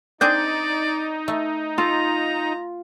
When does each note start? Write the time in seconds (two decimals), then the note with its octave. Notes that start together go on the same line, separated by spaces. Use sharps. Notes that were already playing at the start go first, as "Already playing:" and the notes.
0.21 C4 D4 D#4 G#4 D5 G6
1.28 A3
1.78 F4 A4 A#5